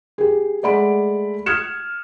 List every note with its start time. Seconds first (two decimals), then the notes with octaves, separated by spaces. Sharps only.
0.18 G4 G#4
0.63 G#3 A3 D5 F#5 B5 D7
1.46 D#6 F6 F#6 G#6 C#7 E7